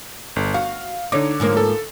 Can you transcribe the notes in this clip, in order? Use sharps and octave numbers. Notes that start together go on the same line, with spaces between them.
G1
F#4 F5
D3 D#4 C#5 D6
G#2 F3 A#3
A4